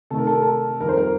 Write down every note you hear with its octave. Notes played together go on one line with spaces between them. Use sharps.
C3 D#3 A3 A4
A#4
A4
A#4
A4
F2 D#3 G3 A#4
C5
A#4